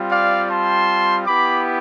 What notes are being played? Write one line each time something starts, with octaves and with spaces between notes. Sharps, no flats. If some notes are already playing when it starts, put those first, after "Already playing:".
Already playing: G3 C4 F4
D5 F5
A5 C6
B3 E4 G4 B5 D6